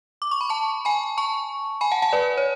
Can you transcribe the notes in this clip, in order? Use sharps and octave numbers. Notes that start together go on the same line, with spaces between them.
D6
C#6
B5
A5 C#6
G#5 B5
A5 C#6
G#5 B5
F#5 A5
F#5 A5
B4 D5
C#5